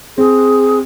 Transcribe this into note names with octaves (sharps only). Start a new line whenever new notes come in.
C4 G#4